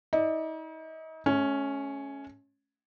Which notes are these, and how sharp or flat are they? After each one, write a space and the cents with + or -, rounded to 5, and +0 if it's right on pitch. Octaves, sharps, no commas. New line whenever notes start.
D#4 +40 D5 +35
A3 -35 C#4 +0